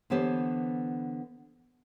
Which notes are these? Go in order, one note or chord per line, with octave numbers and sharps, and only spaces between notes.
D3 E3 B3 G4 C5 C#5